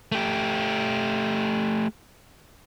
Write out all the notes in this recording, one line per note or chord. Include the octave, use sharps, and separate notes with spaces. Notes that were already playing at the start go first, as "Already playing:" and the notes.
A3 G4